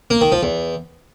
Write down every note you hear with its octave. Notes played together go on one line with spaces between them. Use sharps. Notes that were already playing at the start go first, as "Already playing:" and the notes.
A#3
D#3
F3
E2